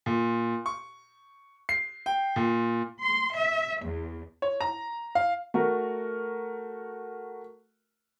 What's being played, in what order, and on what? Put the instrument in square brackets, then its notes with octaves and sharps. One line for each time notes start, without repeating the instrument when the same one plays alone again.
[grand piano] A#2
C#6
C7
G5
A#2
[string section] C6
E5
E2
[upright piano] C#5
A#5
F5
[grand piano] A3 F#4 A#4